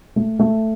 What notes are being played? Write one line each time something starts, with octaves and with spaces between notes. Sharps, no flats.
A3
A3